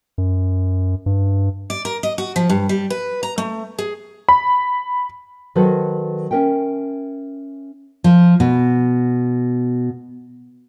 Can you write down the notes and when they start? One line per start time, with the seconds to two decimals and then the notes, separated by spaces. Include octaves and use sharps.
0.18 F#2
1.06 G2
1.70 D5
1.85 A#4
2.03 D#5
2.18 F#4
2.36 F3
2.49 G2
2.69 G3
2.90 B4
3.23 A#5
3.38 A3
3.78 G#4
4.29 B5
5.55 D#3 F#3 F#4 A4 B4 C5
6.31 C#4 A#4 E5 G5
8.04 F3
8.40 B2